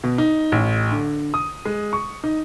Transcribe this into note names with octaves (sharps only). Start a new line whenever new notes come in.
B2
D#4
A1
D3
D#6
G#3
C#6
D#4